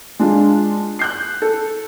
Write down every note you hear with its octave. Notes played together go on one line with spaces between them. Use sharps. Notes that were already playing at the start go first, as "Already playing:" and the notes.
G#3 D4 F4
F#6 G6 C7
A4